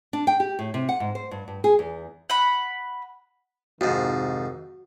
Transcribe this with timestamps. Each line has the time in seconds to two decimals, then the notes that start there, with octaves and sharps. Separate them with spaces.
0.13 D4
0.27 G5
0.40 G4
0.59 A2
0.74 C3
0.89 F#5
1.00 G#2
1.15 C5
1.31 G2
1.48 G2
1.64 G#4
1.79 E2
2.30 F#5 B5
3.81 F2 G#2 C3 D#3 F#4